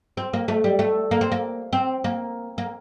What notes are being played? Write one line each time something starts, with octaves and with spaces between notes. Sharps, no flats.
C4
A#3
A3
G3
A3
A#3
C4
A#3
C4
A#3
A#3